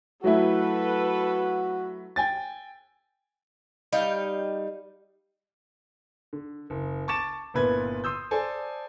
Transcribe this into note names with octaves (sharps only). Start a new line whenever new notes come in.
F#3 A3 E4 F#4 A4 B4
G5 G#5 A6
G3 D#4 F5 G5
D3
F#1
A5 C#6 D6 A6 E7
G1 A#2 B3 E4 B4 G#6
C6 D#6 E6 G6
A4 C5 D5 G#5 A5